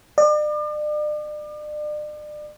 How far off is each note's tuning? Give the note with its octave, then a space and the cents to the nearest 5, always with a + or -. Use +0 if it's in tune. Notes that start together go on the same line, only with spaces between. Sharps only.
D5 +40